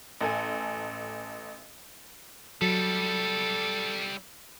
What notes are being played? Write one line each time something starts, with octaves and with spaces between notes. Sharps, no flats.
A1 A4 G#5
F#3 G3 E4 A4